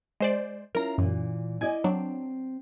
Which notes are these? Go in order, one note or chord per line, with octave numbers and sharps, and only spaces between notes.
G#3 C5 D5
C#4 E4 F4 A#4 A#5
F#2 A#2 E3
E4 D5 D#5 G#5 G#6
F#3 C4 D4